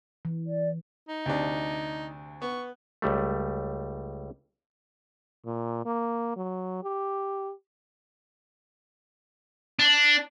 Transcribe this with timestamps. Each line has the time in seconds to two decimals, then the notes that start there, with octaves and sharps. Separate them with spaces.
0.25 E3
0.46 D5
1.09 D#4
1.26 D2 C3 D4
2.42 B3 C#6
3.02 C#2 G3 A3
5.45 A#2
5.86 A#3
6.36 F#3
6.83 G4
9.79 D4